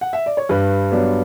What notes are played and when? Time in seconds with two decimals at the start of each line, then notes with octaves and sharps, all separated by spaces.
0.01 F#5
0.13 E5
0.26 D5
0.37 C#5
0.49 G2 B4
0.92 F#3 B3 D4